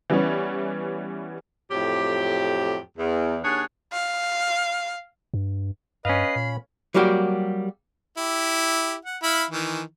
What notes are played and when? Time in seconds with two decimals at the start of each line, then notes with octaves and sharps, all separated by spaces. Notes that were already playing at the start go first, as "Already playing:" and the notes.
0.10 E3 G3 B3 C#4
1.71 F2 A2 F#3 G4
2.98 E2
3.44 D#2 D4 G#4 C#5 F#5
3.93 F5
5.34 G2
6.05 G2 C#4 B4 D#5 F5 C7
6.36 A#2 B5
6.94 F#3 G3 A#3 F#4 G4
8.17 E4 G4
9.05 F#5
9.23 E4 F5 B5
9.51 D#3 E3